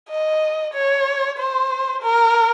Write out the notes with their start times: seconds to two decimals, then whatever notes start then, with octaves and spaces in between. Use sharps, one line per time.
0.10 D#5
0.74 C#5
1.38 C5
2.02 A#4